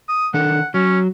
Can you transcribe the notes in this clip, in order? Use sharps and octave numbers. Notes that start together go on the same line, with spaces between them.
D#6
D#3 D4 A4 F#5
F#3 C#4